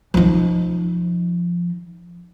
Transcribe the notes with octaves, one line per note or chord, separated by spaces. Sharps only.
F3 D#4